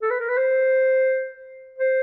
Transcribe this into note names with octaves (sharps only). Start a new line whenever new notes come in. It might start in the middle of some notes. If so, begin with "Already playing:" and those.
A4
B4
A#4
B4
C5
C5